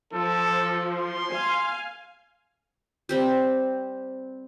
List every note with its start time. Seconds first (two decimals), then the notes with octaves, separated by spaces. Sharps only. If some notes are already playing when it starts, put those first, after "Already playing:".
0.13 F3 A4
0.93 C6
1.30 F5 G#5
3.09 G3 C4 G4